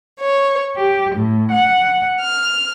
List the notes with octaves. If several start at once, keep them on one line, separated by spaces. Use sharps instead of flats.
C#5
G4
A2
F#5
F6